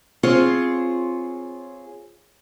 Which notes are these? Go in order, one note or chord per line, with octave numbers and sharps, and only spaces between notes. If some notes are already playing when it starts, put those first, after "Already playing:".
C4 F4 G#4 C#5